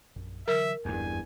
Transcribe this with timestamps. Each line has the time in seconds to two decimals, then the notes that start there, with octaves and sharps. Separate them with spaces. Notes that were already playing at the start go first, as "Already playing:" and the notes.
0.16 A#1 F#2
0.48 D3 E3 F#3 A#4 E5
0.85 F#1 E2 G2 G#5